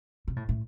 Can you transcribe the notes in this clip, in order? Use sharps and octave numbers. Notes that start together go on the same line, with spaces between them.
C3
A2
A2